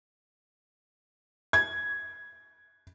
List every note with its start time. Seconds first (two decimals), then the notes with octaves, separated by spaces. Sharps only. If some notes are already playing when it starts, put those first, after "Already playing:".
1.53 G#6